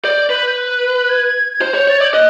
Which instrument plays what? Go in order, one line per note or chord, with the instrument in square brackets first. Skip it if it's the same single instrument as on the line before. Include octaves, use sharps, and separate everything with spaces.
[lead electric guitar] D5 [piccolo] G6
[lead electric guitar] B4
[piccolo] G6
F#6
G#6
G#6
[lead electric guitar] C5 [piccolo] G6
[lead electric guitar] C#5
[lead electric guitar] C#5 [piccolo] A6
[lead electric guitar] D5 [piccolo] G#6
[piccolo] G6
[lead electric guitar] D#5 [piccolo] F#6